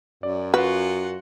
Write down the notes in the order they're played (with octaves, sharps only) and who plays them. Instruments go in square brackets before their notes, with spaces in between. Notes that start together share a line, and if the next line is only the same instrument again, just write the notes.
[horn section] F#2 [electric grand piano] D5
[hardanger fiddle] F4 F#5 [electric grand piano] F#4 [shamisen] B4